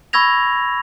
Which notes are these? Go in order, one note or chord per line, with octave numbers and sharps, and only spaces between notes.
B5 C#6 E6 G#6 A#6 F7